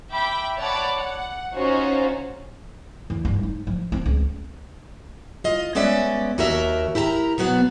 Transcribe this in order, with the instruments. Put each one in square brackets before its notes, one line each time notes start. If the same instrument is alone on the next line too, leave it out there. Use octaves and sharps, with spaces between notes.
[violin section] E5 G5 B5 D6
C#5 D5 F#5 A5 B5 D6
F#5
C#4 D#4 F4 F#4 C5
[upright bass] E2
G2
D#4
F3
C4
C#2
[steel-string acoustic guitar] F4 D#5
G#3 B3 C#4 D5 E5
D#2 F#4 G4 A#4 E5
E4 G4 A#4 A5 A#5
B2 F#3 B3 F#4